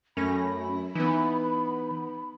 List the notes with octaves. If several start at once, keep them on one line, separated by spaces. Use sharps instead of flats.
F#2 A3 C#4 B5 A#6
E3 B3 D#4